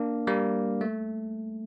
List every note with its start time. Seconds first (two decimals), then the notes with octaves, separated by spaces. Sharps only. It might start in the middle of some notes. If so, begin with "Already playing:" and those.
Already playing: A#3 D4
0.27 G3 A#3
0.81 A3